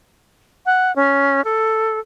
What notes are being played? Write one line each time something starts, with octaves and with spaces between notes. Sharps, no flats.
F#5
C#4
A4